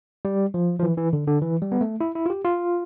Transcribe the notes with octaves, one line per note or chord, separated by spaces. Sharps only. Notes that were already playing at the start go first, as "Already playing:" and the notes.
G3
F3
F3
E3
E3
D3
D3
E3
G3
B3
A3
E4
E4
F4
G4
F4